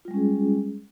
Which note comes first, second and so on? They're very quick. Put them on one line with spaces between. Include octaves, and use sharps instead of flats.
F4 G3 G#3 C#4 G#4